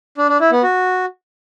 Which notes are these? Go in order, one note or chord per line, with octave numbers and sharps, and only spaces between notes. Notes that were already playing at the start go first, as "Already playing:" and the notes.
D4
D4
E4
B3
F#4